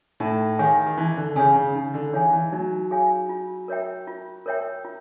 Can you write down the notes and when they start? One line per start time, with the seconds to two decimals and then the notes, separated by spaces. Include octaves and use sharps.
0.20 A2 D#4
0.58 D#3 G#4 C#5 F5 G#5
0.86 D#3
0.98 E3 D#4
1.17 D3
1.36 C#3 G#4 C#5 F5 G#5
1.56 C#3
1.75 C#3 D#4
1.94 D3
2.13 E3 G#4 C#5 F5 G#5
2.33 E3
2.52 F#3 D#4
2.91 G#4 C#5 F5 G#5
3.29 F4
3.68 A#4 C#5 E5 G5
4.07 F4
4.46 A#4 C#5 E5 G5
4.85 F4